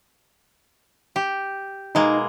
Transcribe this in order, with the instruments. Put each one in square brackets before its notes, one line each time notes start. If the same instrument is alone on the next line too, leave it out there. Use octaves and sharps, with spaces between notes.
[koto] G4
[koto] B2 G#3 A#3 [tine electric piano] D#4